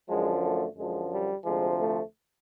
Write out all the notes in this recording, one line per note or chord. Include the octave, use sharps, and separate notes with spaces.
F#2 D3 F3 G#3
A3
F#2 D3 F3 G#3
G3
D2 C3 F3 G#3
A3